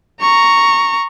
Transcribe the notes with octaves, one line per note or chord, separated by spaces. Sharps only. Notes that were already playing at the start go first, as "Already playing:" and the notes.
A#5 C#6